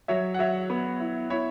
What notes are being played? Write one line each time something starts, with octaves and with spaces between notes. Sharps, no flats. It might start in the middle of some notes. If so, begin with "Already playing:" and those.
F#3 C#5 E5
F#5
F#3 C#5 E5
B3
E4
E4 C#5 E5